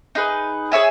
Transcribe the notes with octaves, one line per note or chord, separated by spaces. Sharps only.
D#4 G#4 B4
G#4 C#5 E5 G#5